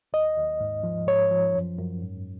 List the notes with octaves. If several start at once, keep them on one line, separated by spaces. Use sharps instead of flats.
D#2 D#5
D#2
G#2
F3
G#2 C#5
F3
F#2
F#2
G#2